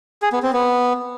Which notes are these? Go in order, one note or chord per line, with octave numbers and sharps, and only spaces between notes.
G#4
B3
C4
B3